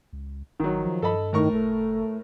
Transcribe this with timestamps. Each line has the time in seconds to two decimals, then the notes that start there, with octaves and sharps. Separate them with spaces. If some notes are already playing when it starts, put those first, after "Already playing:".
0.13 C#2
0.60 G#1 D#3 F#3
0.79 F3
1.02 G2 A4 D#5 B5
1.33 A2 D#3 A#4 C#6
1.52 F#1 A3